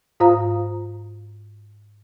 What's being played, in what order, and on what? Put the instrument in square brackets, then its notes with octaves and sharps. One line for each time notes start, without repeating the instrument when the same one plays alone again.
[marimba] G#2 F4 C5 F5 A#5